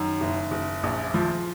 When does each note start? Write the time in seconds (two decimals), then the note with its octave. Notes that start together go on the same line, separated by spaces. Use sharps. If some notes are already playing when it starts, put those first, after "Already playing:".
Already playing: F#2 D#3
0.21 F#1
0.51 F#1
0.83 A#1
1.14 F3